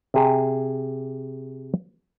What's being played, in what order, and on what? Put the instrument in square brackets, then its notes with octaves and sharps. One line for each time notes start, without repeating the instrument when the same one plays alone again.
[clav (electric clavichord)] C3 G#4